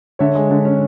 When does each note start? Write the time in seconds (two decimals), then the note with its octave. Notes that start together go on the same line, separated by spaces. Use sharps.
0.19 D3 C#5 E5
0.35 G#3
0.50 D3
0.65 C#4